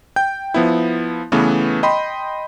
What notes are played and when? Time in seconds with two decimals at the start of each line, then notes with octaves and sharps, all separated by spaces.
0.16 G5 G6
0.54 F3 B3 E4
1.32 C#3 E3 A3 B3
1.83 D#5 G5 B5 C6